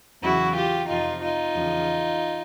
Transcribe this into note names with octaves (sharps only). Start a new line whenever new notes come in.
E2 C#3 F#3 E4 F#4
F4 G4
F2 C3 F3 D#4 F4
D#4 F4
E2 C#3 F3